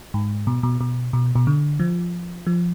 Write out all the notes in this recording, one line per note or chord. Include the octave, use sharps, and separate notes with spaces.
G#2
B2
B2
B2
B2
B2
D3
F3
F3